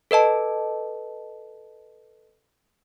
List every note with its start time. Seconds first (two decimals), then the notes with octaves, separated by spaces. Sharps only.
0.11 A4 B4 D#5 A5